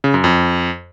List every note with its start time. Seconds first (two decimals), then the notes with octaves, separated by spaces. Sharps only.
0.04 C#3
0.14 F#2
0.24 F2